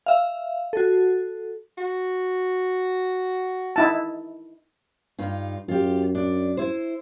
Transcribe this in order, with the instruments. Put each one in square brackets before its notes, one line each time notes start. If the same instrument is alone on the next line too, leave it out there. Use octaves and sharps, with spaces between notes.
[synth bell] E5 F5
F#4 A4
[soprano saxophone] F#4
[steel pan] D#4 E4 A5
[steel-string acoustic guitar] G2 D#4 F4
[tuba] F#2 [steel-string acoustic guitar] F4 G4
[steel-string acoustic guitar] D4 D5
E4 C5